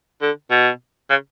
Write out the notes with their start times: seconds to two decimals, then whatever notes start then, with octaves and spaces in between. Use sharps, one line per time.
0.22 D3
0.51 B2
1.10 C#3